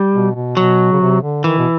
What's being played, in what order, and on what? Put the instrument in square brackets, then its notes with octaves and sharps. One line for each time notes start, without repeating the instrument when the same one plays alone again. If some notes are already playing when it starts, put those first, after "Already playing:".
Already playing: [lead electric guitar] G3
[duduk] B2
B2
[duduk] B2 [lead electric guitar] F#3
[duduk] C#3
C3
D3
[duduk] D#3 [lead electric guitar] E3
[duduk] B2